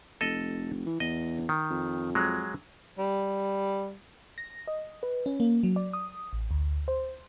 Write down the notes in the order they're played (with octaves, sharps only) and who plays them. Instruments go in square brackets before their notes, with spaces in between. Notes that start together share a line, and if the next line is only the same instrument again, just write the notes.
[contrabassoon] F1 [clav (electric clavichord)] A4 D#5
[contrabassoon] E3
[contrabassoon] E2 [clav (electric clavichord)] D#5
[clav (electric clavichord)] D#3
[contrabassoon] F2
[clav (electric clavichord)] F#3 G#3
[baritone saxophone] G3
[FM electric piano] A#6
D#5
B4
C#4
A#3
F#3
D5
D#6
A1
D2
C5